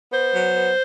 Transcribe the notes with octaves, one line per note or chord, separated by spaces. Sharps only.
B3 C5
F#3
B3